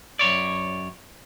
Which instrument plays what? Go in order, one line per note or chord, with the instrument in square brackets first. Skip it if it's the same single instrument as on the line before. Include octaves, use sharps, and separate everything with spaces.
[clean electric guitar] F#2 A#2 C#5 D5